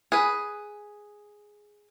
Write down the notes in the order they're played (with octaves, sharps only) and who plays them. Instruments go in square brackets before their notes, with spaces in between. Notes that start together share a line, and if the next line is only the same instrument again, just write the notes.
[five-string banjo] G#4 B4